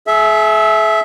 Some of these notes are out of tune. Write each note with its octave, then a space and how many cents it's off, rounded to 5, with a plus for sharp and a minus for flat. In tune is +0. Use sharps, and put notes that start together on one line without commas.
G#4 +45 E5 +0